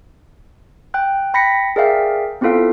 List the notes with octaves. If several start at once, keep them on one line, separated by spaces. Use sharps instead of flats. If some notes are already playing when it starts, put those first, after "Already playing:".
G5 F#6
G5 B5 A#6 B6 C#7
G#4 A#4 D5 E5 F5 G5
B3 C4 E4 F4 A4 F5